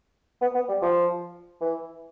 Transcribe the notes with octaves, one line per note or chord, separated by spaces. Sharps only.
B3
B3
G3
F3
E3